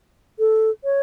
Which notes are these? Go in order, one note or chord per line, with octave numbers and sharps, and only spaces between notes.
A4
C#5